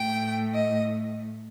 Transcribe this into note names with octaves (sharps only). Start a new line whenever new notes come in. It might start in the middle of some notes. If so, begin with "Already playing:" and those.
Already playing: A2 A3 G5
D#5